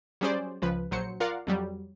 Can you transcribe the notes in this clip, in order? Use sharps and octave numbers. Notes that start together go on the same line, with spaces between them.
F#3 G3 C#4 G#4 C5 D5
C#2 F3 B4
A#1 F#3 C5 C#7
F4 A#4 D5 F5 F#5
F2 F#3 G3